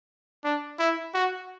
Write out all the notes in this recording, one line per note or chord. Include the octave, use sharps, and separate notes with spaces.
D4
E4
F#4